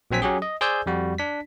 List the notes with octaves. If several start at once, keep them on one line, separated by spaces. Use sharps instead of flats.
A#1 F#3 C4 G#5 B6
F#3 C#4 G4 G#4
D#5
G#4 C5 D5 G#5 E6 G6
F2 G3 F#4
D4 B6